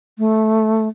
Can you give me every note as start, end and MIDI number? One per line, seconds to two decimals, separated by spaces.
0.18 0.88 57